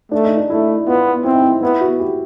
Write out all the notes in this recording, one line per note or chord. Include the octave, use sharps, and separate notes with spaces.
A3 D4
D#4
D4
A3 E4
B3 F4
C4 E4
D#4
E4
B3 E4
F#4
G4